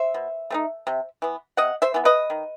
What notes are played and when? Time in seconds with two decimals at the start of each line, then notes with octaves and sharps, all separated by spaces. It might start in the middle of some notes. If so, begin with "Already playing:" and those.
Already playing: C5 E5
0.14 B2
0.50 A3 C4 D#4
0.87 C3
1.22 E3 B3
1.57 C3 D#5 F#5
1.82 C5 E5
1.94 E3 B3
2.05 B4 D#5
2.30 D#3